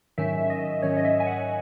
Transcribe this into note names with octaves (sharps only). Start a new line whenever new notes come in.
G#2 D#3 F#3 C#4 E5
D#5
G#2 D#3 F#3 C#4 C#5
D#5
E5
G#5
F#5